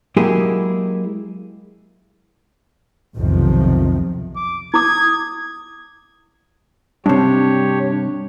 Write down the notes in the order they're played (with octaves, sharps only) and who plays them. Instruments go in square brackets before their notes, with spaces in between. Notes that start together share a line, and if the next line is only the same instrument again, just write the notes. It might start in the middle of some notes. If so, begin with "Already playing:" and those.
[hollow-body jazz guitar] F#3 G#3 A#3 E4 G4 G#4
[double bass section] B1 F2 C3 D#3 F3
[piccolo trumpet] D6
[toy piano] E4 D6 [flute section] D#6 [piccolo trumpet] G#6
[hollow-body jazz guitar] G2 C3 [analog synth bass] D4 [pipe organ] G4 C#5